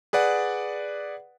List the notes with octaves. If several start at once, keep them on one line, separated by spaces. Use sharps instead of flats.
G#4 B4 D5 F#5